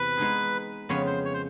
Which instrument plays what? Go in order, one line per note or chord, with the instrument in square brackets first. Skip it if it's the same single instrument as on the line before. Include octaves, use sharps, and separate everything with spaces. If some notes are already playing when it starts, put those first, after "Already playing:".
Already playing: [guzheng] E2 C3 [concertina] B4
[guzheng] G#3 B3 D#4 G#4
[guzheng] F2 C#3 F3 G#3 B3 [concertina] C#5
[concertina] C5
C#5
C5